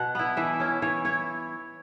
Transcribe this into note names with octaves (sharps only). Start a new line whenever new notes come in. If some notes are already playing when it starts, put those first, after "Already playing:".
Already playing: B2 F#5
B3 E4
E3 E5
C#4 E4
E3 C#5
E4 C#5